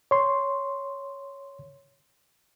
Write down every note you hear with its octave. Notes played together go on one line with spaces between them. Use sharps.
C#5 C6